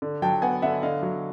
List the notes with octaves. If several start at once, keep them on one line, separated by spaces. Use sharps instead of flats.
D3
F#3 G5 A5
B3 F#5 G#5
D3 E5 F#5
D3 D#5 F5
F#3